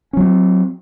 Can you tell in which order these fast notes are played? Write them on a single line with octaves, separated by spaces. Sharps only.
C#4 F#3 C4